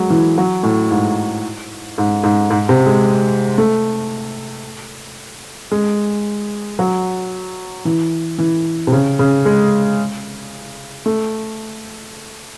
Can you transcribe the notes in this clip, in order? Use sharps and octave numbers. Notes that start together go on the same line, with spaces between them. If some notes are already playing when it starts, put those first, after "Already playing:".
Already playing: F#3 G#3
E3
F#3
A2
G#2
G#2
G#2
G#2
C3
G#3
A3
G#3
F#3
E3
E3
C3
C#3
C#3
G#3
A3